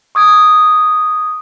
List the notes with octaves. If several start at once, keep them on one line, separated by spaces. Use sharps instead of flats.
C#6 D#6 G#6 D7